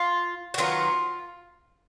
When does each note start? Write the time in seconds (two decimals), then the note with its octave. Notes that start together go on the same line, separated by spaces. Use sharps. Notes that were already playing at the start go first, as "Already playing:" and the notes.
Already playing: F4
0.54 F#4
0.58 D#3 F#3 B3 F4